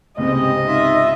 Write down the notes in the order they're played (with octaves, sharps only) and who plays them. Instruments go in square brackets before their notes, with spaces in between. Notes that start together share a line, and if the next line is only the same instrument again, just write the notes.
[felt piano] C#2 G#2 C3 [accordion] G3 G#3 [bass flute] C4 [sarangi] D#5
[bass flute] D#4 [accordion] F4 E5